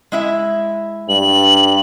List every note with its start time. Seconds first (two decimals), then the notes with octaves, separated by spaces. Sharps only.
0.12 G#3 E4 E5
1.09 G2 F#7